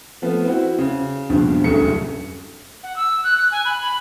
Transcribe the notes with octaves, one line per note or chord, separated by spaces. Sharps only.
F3 A3 B3
C4 E4 F#4
C#3
A#1 G2 B2 F3
D1 C2 F#2 D3 A3 C#7
F#5
E6
F#6
F#6
G#5
B5
B5